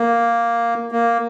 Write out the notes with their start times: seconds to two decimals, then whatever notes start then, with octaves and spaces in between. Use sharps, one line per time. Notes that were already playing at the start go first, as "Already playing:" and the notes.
Already playing: A#3
0.92 A#3